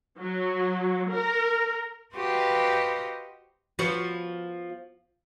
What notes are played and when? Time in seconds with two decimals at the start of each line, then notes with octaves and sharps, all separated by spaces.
0.18 F#3
1.11 A#4
2.15 F#4 G4 B4 C5 D#5 F5
3.79 F3 B3 F#4